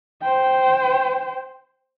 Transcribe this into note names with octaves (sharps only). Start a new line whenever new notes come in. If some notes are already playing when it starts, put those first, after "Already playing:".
C5 G5